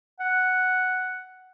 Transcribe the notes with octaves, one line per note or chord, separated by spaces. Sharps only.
F#5